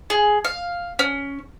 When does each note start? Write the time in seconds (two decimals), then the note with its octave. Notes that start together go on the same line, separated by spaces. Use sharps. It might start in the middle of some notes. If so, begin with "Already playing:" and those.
0.10 G#4
0.45 F5
0.99 C#4